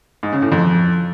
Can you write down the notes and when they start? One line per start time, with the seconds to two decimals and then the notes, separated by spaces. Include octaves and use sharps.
0.23 G#2
0.33 C#3
0.42 A2
0.52 F2